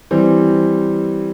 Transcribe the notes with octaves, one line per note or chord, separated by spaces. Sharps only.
E3 G3 C4